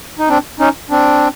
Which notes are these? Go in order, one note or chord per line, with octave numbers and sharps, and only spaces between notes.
D#4
C4 D4
C#4 D#4
C4 D4